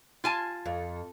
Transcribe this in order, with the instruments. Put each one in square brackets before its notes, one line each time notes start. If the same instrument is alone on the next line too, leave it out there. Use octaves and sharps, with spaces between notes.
[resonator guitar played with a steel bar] F4 G#5 A5
[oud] F2